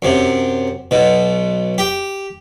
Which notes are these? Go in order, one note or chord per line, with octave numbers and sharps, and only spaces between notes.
F#2 C3
B1 B2
G4